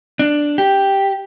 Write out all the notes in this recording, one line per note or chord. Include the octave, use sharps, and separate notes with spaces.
D4
G4